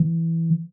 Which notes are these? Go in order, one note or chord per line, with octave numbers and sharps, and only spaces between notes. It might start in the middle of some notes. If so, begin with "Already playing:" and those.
Already playing: E3